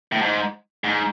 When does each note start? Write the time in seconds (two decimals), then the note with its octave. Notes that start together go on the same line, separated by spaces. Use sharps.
0.12 A2
0.21 G#2
0.84 G#2